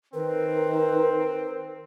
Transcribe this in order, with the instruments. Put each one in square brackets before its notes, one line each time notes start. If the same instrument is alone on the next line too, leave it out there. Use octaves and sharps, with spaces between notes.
[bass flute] D#3 [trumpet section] C4 [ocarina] A#4 [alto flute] B4